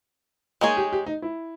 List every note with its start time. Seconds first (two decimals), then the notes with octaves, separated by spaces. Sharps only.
0.61 G#3 A#3 D#4 G#4 C#5
0.77 G4
0.92 G4
1.06 D#4
1.22 E4